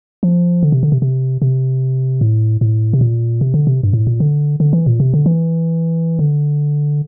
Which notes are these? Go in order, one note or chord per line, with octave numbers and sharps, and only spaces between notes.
F3
D3
C3
D3
C3
C3
C3
A2
A2
C3
A#2
C3
D3
C3
G2
A2
A#2
D3
D3
E3
A#2
C3
D3
E3
D3